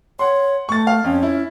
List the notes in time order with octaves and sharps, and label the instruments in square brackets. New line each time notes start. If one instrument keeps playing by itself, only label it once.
[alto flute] C#5 [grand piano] F#5 C6
[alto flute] A3 [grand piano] C#6 A6
[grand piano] F5
[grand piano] F2 [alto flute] C#4
[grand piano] E4